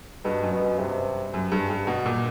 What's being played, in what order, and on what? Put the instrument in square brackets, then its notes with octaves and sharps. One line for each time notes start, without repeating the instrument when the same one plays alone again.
[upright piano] G2 [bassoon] B2
[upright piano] F#2
[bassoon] B2
[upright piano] F#2
[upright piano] G2 [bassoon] C3
[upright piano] F#2
G2
G2
B2
A#2